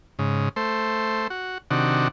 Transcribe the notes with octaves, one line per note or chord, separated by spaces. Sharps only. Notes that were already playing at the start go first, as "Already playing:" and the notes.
G#2 C#3
A3 C5
F#4
C3 D#3 D4 F#4